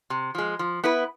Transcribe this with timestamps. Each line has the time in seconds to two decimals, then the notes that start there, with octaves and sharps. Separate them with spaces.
0.10 C3
0.35 F3 G#3
0.59 F3
0.84 B3 E4 B4